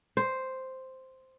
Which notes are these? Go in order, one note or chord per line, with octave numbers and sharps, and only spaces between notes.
C5